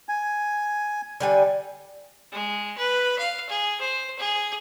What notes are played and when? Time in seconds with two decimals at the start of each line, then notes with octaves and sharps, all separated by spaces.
0.09 G#5
1.20 D3 G3 G#5
2.33 G#3
2.78 B4
3.19 F5
3.49 G#4
3.81 C5
4.19 G#4